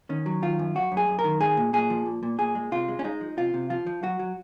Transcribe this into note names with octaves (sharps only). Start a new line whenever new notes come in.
D#3 C#4
F#3
D#3 F4
F#2
F#2 F#4
F#2
G#4
F#2
A#4
D#3
G#3 G#4
A#2
A#2 G#4
F3
A#2
A#2
A#2 G#4
G#3
C3 F4
G#3
C#4
G#3 D#4
F3
C3 F4
C3
F3 F4
F3
F#3 F#4
F#3